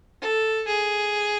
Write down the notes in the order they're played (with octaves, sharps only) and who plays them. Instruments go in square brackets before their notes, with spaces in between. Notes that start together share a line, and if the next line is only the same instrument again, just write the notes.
[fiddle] A4
G#4